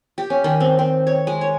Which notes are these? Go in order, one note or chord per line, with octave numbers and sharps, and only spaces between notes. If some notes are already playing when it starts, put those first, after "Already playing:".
G4
C#4
D#3
C4
C4
C#5
G#3
C#5